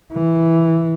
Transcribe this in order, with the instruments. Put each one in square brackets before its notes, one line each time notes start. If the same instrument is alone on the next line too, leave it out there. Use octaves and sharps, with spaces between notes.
[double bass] E3